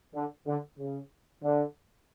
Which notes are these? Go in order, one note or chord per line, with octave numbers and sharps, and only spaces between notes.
D3
D3
C#3
D3